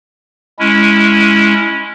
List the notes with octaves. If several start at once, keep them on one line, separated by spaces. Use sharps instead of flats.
G#3 C#4 E4